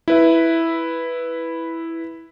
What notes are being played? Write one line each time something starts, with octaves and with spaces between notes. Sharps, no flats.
E4 B4 E5